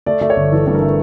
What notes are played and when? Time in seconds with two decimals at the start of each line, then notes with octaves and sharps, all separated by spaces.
0.06 A3 D5
0.21 A3 D5
0.30 C#5
0.36 G1
0.52 E3 A4
0.67 G2 A4
0.75 A#4
0.82 A3